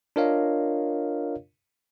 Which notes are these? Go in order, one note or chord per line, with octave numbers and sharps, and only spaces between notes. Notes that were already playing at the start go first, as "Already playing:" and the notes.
D4 F4 A#4 C#5 D#5 F5